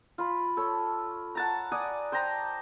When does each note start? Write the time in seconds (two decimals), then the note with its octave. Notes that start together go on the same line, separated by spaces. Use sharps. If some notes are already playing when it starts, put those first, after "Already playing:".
0.18 F4 B5
0.57 A4 C#5
1.35 F#5 A5 A#5
1.72 D5 F#5 G#5 D#6
2.12 C5 G5 A5 A#5